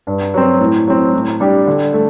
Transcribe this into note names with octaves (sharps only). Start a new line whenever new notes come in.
G2
F#3 C4
A2
F#3 C4
A2
G3 D4 G4
D3
A3